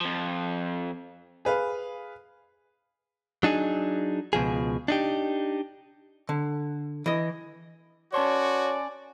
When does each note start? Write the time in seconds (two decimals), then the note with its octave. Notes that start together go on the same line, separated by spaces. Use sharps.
0.01 F2 F3
1.45 G#4 B4 F5
3.43 F#3 D4 D#4 G#4
4.33 C#2 B2 F3 G#4
4.88 D4 D#4 G4
6.29 D3
7.06 E3 D#5
8.13 C#4 F#4 C#5 D5 A5 C6